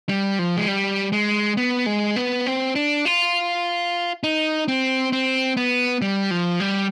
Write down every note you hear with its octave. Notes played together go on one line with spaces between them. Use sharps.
G3
F3
G#3
G3
G#3
B3
G#3
B3
C4
D4
F4
D#4
C4
C4
B3
G3
F3
G3